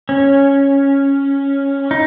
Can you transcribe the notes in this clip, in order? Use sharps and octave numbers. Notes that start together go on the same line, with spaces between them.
C#4
D#4